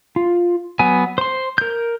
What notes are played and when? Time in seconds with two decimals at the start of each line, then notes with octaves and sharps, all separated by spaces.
0.16 F4
0.79 F#3 B3 G#5
1.18 C5 C6
1.58 A#4 G6